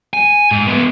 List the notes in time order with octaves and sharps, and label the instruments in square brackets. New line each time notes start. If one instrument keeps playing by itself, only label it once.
[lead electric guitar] G#5
G#2
G#3 B3